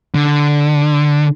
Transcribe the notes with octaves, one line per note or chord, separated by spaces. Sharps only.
D3